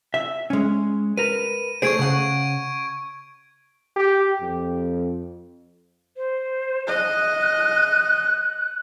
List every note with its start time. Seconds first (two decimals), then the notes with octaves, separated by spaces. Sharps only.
0.14 E5
0.50 G#3 C#4
1.18 A#4 B4 D#7
1.82 A3 G#4 C5 C#6 G#6 D7
1.99 C#3 F#5
3.96 G4
4.41 F2
6.17 C5
6.87 D#5 F#6